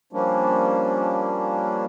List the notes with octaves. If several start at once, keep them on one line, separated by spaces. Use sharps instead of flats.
F3 G3 A#3 C#4 D4